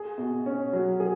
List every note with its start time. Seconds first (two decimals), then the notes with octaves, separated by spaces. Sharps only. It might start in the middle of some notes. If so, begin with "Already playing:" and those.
Already playing: G#4
0.18 B2
0.46 C#4
0.73 F#3
1.00 G#4